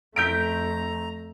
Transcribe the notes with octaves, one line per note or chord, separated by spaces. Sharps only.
F2 A3 A#5 G6 B6 D7